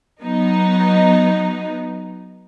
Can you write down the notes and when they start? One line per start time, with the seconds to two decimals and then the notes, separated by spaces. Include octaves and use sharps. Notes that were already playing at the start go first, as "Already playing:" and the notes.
0.20 F#3 B3 D#4